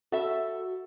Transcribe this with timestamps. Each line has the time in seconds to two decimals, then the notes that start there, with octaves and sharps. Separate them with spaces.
0.12 F#4 A4 E5